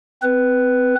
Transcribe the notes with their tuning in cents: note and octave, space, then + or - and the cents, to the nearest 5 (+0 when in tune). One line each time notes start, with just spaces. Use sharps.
C4 -30 B4 +0